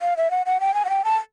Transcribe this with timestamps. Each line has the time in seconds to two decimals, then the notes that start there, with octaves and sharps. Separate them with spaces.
0.02 F5
0.17 E5
0.31 F#5
0.46 F#5
0.60 G5
0.74 G#5
0.85 F#5
0.90 G5
1.05 A5